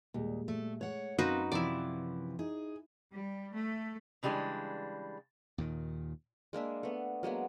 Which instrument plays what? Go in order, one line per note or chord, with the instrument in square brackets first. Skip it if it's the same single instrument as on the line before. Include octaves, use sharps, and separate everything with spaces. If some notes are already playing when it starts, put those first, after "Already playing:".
[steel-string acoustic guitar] D#2 [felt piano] A#2 G3 G#3
[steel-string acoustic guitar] A3
[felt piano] G#3 [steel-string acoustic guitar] C#5 F#5
[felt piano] F#2 [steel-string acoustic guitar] A#3 C4 [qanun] D#4 F#4 B4
[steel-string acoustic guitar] C3 E3 F3 [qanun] E4 D5
[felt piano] D#4 [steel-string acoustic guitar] G#4
[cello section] G3
A3
[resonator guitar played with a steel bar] C#3 E3 G3 G#3 D4
[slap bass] D#2 A#2 D#3
[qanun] G#3 A#3 D4 E5
A3 B3
F#3 G#3 A#3 B3